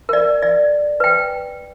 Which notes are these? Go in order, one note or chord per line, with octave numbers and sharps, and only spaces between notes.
A#4 D5
D5
B4 G5